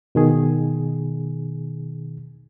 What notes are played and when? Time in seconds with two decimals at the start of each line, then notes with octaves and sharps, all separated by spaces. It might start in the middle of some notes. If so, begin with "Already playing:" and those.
0.15 B2 D#3 G#4